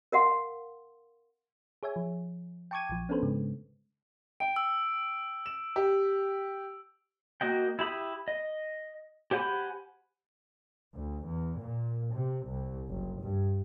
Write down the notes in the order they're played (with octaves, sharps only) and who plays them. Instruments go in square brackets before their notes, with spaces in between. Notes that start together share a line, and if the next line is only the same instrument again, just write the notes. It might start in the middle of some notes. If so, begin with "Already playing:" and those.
[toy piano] A#4 F5 F#5 C6
[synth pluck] G#4 C#5 E5 G#5
F3
G5 A5 C#6 D6 G#6 D#7
A#1 F3
B3 C#4 D4 A4 B4 C5
G#2 C#3 G#3
[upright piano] G5 [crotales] D7
[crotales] E6
[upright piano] E7
G4
[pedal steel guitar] A#3 F#4 D#5 G5
E4 G4 B5 D#6
D#5
G4 C5 F#5 G#5 B5
[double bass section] D2
E2
A#2
C3
C2
F#1
G2